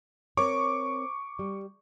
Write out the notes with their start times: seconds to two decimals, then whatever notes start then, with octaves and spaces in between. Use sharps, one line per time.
0.37 C4 A#4 C#5 C#6 D6
1.39 G3